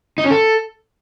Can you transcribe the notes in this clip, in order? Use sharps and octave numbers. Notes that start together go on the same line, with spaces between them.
D#4
C#4
A4